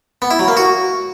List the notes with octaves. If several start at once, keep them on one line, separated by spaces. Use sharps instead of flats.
B3
E4
F#3
A#3
F#4